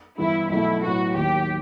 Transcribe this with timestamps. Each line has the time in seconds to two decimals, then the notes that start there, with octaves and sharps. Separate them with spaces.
0.18 G2 E3 B3 E4
0.50 B1 B2 A3 E4
0.82 A2 F#3 B3 E4 F#4
1.14 D#2 D#3 F#3 G4